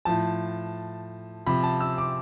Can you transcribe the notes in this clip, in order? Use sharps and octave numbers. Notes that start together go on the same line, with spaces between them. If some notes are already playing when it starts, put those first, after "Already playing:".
A2 F3 A5
C3 F3 B5
A5
E6
D6